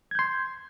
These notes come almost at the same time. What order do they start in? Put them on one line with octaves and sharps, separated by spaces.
G#6 G6 C6